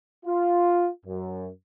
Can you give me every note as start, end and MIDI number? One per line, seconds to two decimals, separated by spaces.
0.25 0.88 65
1.05 1.48 42